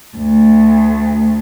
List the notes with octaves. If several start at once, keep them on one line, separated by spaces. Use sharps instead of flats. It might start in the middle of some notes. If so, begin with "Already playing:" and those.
D2